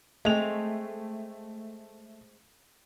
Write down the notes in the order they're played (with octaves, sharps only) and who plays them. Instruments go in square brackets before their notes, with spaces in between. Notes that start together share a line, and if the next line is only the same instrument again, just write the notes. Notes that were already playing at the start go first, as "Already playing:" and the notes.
[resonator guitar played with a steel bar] G#3 C4 [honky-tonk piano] A3 F7